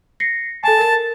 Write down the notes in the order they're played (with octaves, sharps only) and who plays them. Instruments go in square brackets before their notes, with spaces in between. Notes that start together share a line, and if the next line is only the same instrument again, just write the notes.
[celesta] A#6 C7 C#7
[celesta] A4 G#5 [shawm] A5
[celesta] A#4 A6